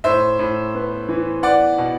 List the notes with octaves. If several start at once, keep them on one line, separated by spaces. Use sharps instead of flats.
A2 C5 E5
A2
B3
E3
B3 D5 F#5
B2